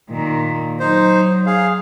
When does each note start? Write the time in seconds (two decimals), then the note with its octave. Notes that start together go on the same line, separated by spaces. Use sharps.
0.10 A#2 D#3
0.80 F#3 D#4 C5
1.46 G#4 F5